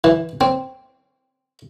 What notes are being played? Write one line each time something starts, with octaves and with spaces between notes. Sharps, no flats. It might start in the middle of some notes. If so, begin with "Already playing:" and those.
E3
C4